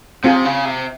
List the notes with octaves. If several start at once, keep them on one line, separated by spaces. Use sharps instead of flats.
C3 C4 F4 G#4
C#3
C3